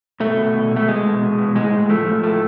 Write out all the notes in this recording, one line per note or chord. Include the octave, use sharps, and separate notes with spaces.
B2 A3
B2
B2
B2
A3
B2 G#3
B2
B2
B2
A2 G#3
A2
F3 A3
F3
A2 A3